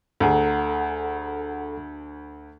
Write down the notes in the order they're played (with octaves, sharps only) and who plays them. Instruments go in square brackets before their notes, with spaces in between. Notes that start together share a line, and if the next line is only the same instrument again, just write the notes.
[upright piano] D2 G#4 [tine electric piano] A4 F#5 A#5